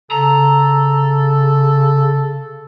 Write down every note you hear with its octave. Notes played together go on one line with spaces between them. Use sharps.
C#3 A4 A#5